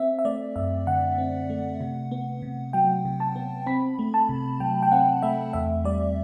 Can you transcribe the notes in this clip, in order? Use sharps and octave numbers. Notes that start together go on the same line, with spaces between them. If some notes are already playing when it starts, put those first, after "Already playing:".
Already playing: C4 E5
E5
A3 D5
F#2 E5
D3 F#5
C4
A3
C3
B3
C3
F#3 G5
C3
A5
B3
C4 B5
A3
A5
C3
F#3 G5
G5
C4 F#5
A3 E5
E2 E5
G3 D5